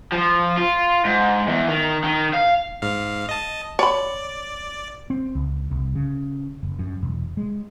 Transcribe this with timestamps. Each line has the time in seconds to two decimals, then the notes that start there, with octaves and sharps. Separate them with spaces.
0.12 F3
0.58 F4
1.05 G#2
1.48 E2
1.69 D#3
2.04 D#3
2.34 F5
2.82 G#2 F5
3.29 D#5 A5
3.79 C#5 D5 B5
5.10 C4
5.35 C#2
5.71 C2
5.95 C#3
6.63 F#1
6.79 F#2
7.03 E1
7.37 G#3